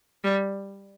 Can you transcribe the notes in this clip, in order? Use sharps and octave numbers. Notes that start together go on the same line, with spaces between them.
G3